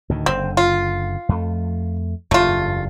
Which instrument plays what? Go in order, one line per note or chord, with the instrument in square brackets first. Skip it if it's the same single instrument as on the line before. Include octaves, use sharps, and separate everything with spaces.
[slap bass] D2 A2 D#3
[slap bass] F#1 D3 [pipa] C4
[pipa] F4
[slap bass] F2 A3
[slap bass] F#1 E2 G2 [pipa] A3 F4